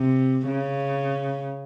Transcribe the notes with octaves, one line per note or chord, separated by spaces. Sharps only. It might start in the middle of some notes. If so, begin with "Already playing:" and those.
Already playing: C3
C#3